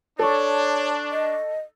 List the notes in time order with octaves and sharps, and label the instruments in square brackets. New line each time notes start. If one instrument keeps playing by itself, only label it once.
[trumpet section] D4 [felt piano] A4 [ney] C#5 [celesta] A5 C#6
[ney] D#5